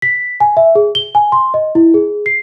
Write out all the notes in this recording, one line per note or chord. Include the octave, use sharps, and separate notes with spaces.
B6
G#5
E5
G#4
G7
G#5
C6
D#5
E4
G#4
C7